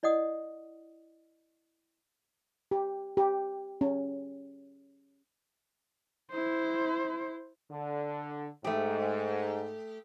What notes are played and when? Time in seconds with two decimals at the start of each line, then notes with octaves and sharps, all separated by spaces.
0.03 E4 D5 D#5 F#5 D#6
2.71 G4
3.17 G4
3.81 C#4
6.31 E4 C5
7.70 D3
8.64 G#2 A3 G4